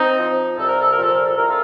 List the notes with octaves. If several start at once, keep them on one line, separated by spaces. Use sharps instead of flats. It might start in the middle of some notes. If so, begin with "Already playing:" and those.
Already playing: C4 D#4
F3
C2 A4
A#4
A4
A#2 F3 A#4
A4
A#4
A4
C2 A#4
F4 A4